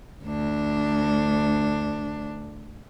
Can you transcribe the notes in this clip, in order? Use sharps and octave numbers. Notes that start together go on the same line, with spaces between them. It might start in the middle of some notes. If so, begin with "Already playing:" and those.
D2 D4